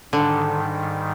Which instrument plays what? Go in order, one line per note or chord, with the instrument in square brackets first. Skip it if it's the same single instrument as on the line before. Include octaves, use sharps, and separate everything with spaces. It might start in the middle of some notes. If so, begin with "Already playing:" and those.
[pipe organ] G#2 D#3 G3 [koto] D3